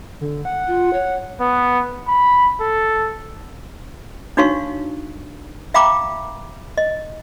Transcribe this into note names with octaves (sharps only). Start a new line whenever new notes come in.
D3
F#5
F4
C#5
B3
B5
A4
D4 D#4 F#4 C#5 F5 C#6
E5 F5 G5 A#5 B5 D6
D#5